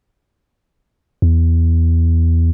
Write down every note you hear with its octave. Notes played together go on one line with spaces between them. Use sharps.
E2